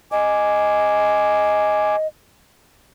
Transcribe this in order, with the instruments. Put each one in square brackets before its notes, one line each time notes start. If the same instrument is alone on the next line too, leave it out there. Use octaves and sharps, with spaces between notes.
[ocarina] D#5 [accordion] G#5 D6